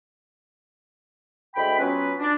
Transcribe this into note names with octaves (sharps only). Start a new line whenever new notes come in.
D2 G#3 G5 B5
F#3 B3 C#4 F4 B4
D4